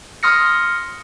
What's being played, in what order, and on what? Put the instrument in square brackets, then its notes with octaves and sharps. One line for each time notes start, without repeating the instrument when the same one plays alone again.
[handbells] C6 D#6 F6 A#6 C#7